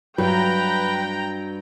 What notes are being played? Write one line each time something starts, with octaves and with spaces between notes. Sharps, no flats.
G2 F#3 B4 G5 A#5